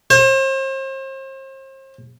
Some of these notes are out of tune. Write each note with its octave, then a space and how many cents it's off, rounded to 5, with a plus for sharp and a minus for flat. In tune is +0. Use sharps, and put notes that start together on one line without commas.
C5 +40